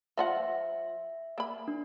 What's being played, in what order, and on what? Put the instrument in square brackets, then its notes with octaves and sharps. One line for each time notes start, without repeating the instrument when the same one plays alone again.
[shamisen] F3 F4 F#5 [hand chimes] E5
[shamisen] A#3 B5
[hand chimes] D4